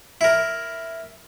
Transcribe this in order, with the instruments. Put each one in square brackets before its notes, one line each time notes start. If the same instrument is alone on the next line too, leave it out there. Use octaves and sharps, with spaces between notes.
[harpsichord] E4 A#4